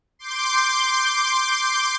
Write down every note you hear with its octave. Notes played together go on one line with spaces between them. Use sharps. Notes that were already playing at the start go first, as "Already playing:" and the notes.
C6 D6 G6